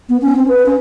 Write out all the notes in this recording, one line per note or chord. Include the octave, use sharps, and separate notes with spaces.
B3
C#4
C4
B4
C#4